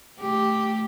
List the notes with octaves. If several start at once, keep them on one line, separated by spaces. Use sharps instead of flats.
A3 G4